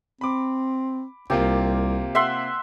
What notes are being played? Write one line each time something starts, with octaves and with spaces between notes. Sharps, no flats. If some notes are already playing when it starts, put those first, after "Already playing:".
C4 B5 D6
C2 C3 A#3 F4 G4
E5 F#5 C6